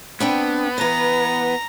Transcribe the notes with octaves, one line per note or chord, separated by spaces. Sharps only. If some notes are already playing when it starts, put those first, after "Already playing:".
B3 C4 D4 G5
E3 B4 A#5